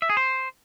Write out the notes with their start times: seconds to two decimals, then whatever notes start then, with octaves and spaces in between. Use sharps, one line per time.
0.02 E5
0.09 G#4
0.17 C5